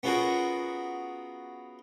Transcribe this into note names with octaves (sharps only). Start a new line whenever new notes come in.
B3 C#4 F4 F#4 G#4 A#4